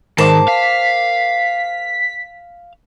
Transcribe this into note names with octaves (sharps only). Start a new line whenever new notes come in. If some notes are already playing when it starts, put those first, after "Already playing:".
G#2 D#3 A#4 C5 A5 D6
F5 B6